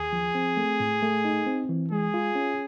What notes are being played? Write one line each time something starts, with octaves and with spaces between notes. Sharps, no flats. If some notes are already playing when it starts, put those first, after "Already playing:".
Already playing: D#2 G#4
F3
C4
A3
A2
A3
D#4
C4
E3
G#3 G#4
F4
C#4